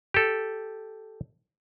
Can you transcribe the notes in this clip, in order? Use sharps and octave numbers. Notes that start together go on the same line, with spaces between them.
G4 A4